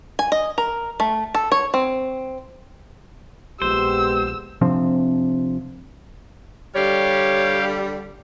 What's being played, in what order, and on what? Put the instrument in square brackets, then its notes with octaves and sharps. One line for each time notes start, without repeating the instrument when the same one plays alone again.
[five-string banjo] G#5
D#5
A#4
A3
A4
C#5
C4
[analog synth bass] A#1 [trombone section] G#3 B3 G4 [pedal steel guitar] C5 [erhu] E6
[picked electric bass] C3 F3 C4 D4
[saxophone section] D3 G3 [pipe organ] G4 F5 [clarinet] C#5